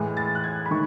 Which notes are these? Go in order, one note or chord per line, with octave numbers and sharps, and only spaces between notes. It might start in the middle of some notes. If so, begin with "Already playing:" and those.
Already playing: A2 E3 G#3
A6
F#6
G#6
B5
D#3 A3 C#6